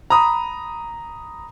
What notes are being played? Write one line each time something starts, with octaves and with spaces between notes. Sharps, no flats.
A#5 B5 D#6